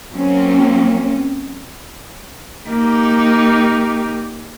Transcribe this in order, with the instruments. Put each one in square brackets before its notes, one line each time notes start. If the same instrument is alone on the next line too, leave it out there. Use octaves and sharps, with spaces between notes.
[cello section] F#3 A#3 C4 C#4
[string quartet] A#3 D#4 G4